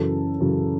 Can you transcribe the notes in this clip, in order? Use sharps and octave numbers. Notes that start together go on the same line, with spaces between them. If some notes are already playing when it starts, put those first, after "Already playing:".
Already playing: F#2 C#3 E3 A4
F#2 C#3 E3